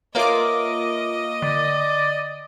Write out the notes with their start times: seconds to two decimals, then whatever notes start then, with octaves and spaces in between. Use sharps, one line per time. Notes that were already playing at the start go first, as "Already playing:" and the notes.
0.15 A#3 F4 B4 C#5 D#5 E5 D6
1.42 D3 D5